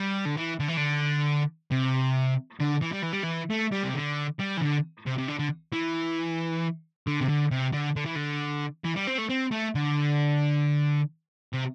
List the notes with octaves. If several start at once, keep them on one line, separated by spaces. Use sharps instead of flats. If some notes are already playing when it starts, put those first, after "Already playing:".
Already playing: G3
D3
E3
D3
E3
D3
C3
D3
E3
G3
E3
G3
E3
A3
G3
C3
D3
G3
E3
D3
C3
C3
D3
D3
E3
D3
C3
D3
C3
D3
D3
E3
D3
E3
G3
C4
A3
C4
A3
D3
C3